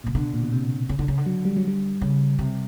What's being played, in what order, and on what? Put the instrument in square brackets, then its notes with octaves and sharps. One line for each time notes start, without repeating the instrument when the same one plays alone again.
[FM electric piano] A#2 [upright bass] C#3
[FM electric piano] B2 [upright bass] D3
[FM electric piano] A#2
B2
C3
[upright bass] C#3
D3
C#3
D3
[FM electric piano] F#3
G3
F#3
G3
[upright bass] C#3
C3